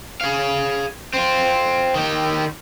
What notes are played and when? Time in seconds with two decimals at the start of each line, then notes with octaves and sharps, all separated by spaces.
0.21 G#4 F5
1.14 C4 F4
1.95 D#3 G4